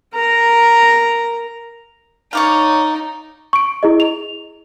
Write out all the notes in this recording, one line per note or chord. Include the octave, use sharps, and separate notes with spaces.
A#4 A#5
D#4 C#5 D5 F5
C#6 D7
E4 G#4 D#5
F7